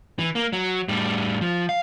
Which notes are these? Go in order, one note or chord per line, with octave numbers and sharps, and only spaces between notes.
E3
A#3
F#3
A2 G3
F3
F5